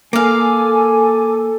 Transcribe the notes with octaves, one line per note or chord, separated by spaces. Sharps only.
A#3 A4 D5 F5 G#5